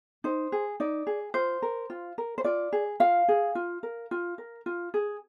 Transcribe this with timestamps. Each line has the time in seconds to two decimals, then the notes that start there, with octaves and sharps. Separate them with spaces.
0.24 D#4 C5
0.52 G#4
0.80 D#4 D5
1.07 G#4
1.34 F4 C5
1.62 A#4
1.90 F4
2.18 A#4
2.38 C5
2.44 F4 D5
2.73 G#4
3.00 F4 F5
3.28 G#4
3.55 F4
3.83 A#4
4.11 F4
4.38 A#4
4.66 F4
4.94 G#4